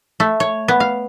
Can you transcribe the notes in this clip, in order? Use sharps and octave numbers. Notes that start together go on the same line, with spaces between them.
A3
C#5
B3
F5